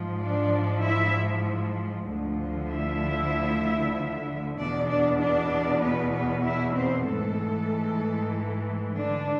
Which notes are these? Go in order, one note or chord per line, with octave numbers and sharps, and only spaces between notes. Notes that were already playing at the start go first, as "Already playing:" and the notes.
Already playing: G#2 F3
D4 D5
E4 E5
D2 D3 F3
E4 E5
E2 B2 D4 D5
D4 D5
D4 D5
B3 B4
B3 B4
E4 E5
C4 C5
G#2 E3 A3 A4
D3 D4